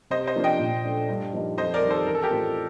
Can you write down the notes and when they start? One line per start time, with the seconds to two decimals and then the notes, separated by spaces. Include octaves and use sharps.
0.10 C3 C5 D#5
0.27 C5 D#5
0.36 F3 A#3 D4 F4
0.44 D#5 G5
0.59 A#2
0.85 A3 D4
1.09 G2
1.33 F3 A#3 D#4 G4
1.57 F2 C5 D#5
1.74 A#4 D5
1.81 D#3 G3
1.91 A4 C5
2.06 A1 A#4
2.15 A4
2.22 G4 A#4
2.31 A2 A3 C4 F4